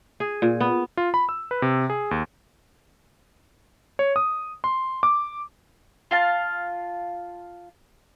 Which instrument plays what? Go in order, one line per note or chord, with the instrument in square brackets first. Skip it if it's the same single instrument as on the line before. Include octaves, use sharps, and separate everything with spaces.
[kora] G#4
A#2
B3
[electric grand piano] F4
B5
E6
B4
C3
G#4
D#2
C#5
D#6
C6
D6
[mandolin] F4 F5 A5